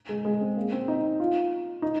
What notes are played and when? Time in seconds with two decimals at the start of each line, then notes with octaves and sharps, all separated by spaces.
0.09 G#3
0.25 G#3
0.41 C4
0.57 A#3
0.72 C4
0.88 D#4
1.20 F4
1.82 D#4